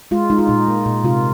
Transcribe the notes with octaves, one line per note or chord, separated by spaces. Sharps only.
G#3 F4
G#3 D#4
F4
A#2 D#4
A#3
A#2
C3 F4